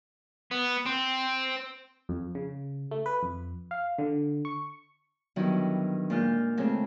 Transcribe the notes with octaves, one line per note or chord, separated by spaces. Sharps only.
B3
C4
F2
C#3
A3
B4
F2
F5
D3
C#6
D3 D#3 F#3 G3 B3 E4
A#2 G#3 F4 F6 G6
C#3 G#3 A3 C4